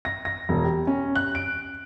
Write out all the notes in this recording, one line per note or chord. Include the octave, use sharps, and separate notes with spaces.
A#6
A#6
E1
G4
C#4
F#6
D7